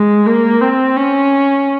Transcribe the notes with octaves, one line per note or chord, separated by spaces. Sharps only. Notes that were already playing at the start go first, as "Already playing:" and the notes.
Already playing: G#3
A#3
C4
C#4